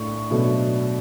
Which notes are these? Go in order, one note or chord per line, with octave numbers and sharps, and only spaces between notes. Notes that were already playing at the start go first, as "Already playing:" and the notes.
Already playing: A2 D4 C#6
B2 F#3 A3 D4